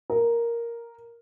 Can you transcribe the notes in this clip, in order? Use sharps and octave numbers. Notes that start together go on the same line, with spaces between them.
A#4